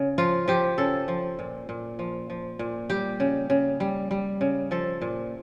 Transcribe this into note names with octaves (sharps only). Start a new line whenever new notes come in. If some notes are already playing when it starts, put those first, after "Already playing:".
Already playing: C#3
F3 F4
F3 G4
C#3 A4
F3
A#2
A#2
F3
F3
A#2
G3 G4
C#3
C#3
G3
G3
C#3
F3 A4
A#2